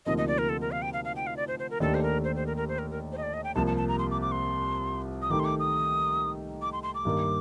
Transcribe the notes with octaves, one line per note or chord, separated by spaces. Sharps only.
D2 C3 F3 A#3 D#4 D#5
D#5
D5
A#4
A4
A#4
F5
G5
F5
F5
G5
F5
D5
C5
C5
A#4
D#2 D#3 A3 D4 G4 A4
C5
A#4
C5
C5
A#4
A#4
C5
A#4
A#4
C5
D#5
D5
D#5
G5
C2 C3 F3 A#3 A5
A5
A5
A#5
C6
D6
D6
C6
D#6
D#3 A3 D#4 G4 D6
C6
D6
D#6
D6
C6
C6
D6
G2 D#3 G3 A#3